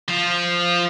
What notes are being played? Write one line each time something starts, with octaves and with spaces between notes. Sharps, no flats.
F3 F4